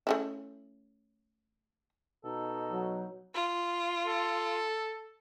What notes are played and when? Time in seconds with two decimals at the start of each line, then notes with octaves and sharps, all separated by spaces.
0.07 A3 C#4 E4
2.25 B2 D#4 A4
2.72 F#3
3.34 F4
4.05 A4